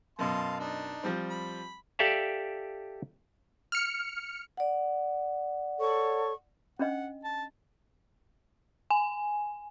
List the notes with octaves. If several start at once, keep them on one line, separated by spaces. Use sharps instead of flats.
F#2 B2 F5 A5 C6
D4 D#4
F3 G3 C4
B5
G4 A4 D5 E5 F5
F6 C#7
D5 F#5
A4 C#5 C#6
C#4 D4 D#5 F#5
A5
G#5